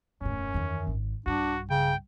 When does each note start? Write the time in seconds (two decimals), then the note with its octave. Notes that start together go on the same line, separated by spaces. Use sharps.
0.21 E1 F#2 A2 C#4
0.54 E2 D#3
0.87 G#1
1.26 B1 G2 D4 F#4
1.70 C#3 G5